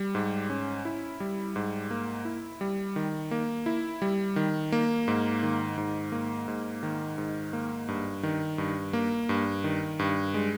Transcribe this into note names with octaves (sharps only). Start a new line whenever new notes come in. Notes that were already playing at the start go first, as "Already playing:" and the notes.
Already playing: G3
G#2
C#4
E4
G3
G#2
A#3
E4
G3
D#3
A#3
E4
G3
D#3
A#3
G#2
D#3
G#2
A#3
G#2
D#3
G#2
A#3
G2
D#3
G2
A#3
G2
D#3
G2
G#3